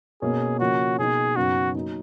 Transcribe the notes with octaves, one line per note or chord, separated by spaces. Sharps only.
B2 A#3 C#4 G#4
C#3 F3 A#3 C#4 F#4
B2 A#3 D#4 G#4
F#2 C#3 F#3 B3 D#4 F#4
F#3 A#3 D#4